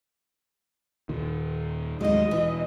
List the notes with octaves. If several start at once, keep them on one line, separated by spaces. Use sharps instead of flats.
D#2 A#2 D#3
A1 D#2 F#3 G#3 D#4 D#5
E1 E3